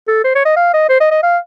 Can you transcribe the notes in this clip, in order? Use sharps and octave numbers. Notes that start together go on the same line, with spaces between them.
A4
C5
C#5
D#5
F5
D#5
C5
D#5
D#5
F5